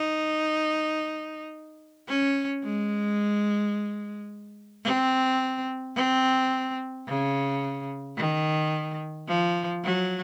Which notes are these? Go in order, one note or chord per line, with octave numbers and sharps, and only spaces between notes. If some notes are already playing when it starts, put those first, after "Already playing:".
Already playing: D#4
C#4
G#3
C4
C4
C#3
D#3
F3
F#3